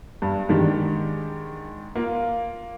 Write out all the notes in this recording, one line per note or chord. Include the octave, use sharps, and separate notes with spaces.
G2
G#2 D#3 D4 G4
A#3 F4